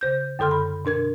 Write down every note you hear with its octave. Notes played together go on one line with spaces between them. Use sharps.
C#3 C5 G6
F#2 D3 A4 C6 F6
B5
B2 D4 A#4 G#6